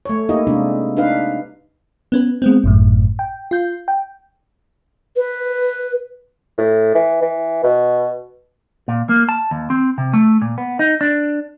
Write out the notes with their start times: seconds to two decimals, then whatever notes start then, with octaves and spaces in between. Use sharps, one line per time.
0.05 A3 C#5
0.29 A#3 D#4 E4 G4 D#5
0.47 C3 G#3 C4 D4
0.97 D4 D#4 B4 F5
2.12 B3 C#4 B4
2.42 G#3 B3 C4
2.64 G#1 F#2 A2
3.19 G5
3.51 F4 G6
3.88 G5
5.16 B4
6.58 A2
6.95 E3
7.22 E3
7.64 B2
8.88 A#2
9.09 A#3
9.29 A5
9.51 D#2
9.70 C4
9.98 C3
10.13 A3
10.42 A#2
10.58 B3
10.79 D#4
11.01 D4